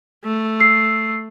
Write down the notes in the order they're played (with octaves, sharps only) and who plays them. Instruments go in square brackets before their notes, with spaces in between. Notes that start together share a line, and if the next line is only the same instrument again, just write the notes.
[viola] A3
[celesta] E6 C7